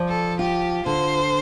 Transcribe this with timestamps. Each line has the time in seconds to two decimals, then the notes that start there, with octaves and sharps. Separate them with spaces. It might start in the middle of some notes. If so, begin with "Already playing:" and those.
Already playing: F3 D5
0.08 A4
0.39 F4 G4
0.86 D3 C5